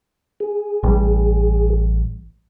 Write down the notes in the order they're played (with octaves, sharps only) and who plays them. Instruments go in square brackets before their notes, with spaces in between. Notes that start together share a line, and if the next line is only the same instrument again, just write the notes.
[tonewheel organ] G#4
[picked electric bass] A1 G3